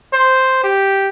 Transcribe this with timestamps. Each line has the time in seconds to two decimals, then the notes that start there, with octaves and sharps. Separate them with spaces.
0.13 C5
0.64 G4